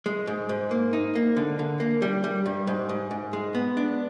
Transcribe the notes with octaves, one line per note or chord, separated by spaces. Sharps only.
G#3
G#2
G#2
A#3
D#4
A#3
D3
D3
A#3
G3
G3
G2
G#2
G#2
G#2
G#3
B3
D4